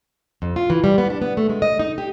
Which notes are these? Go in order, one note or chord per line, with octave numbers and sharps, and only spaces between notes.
F2
F4
E3
G3
B3
D4
B3
A3
G#3
D#5
D#4
G4